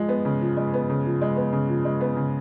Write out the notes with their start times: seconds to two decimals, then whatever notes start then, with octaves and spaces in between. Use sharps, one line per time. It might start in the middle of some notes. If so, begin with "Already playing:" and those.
Already playing: F3 G#3
0.09 B3
0.25 C#3
0.41 F3
0.57 G#3
0.74 B3
0.90 C#3
1.05 F3
1.22 G#3
1.36 B3
1.53 C#3
1.69 F3
1.85 G#3
2.01 B3
2.16 C#3